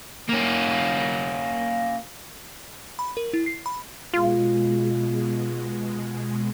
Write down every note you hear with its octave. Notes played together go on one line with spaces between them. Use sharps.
A#3 C#4
B5
A#4
E4
C7
B5
B2 G#3 F4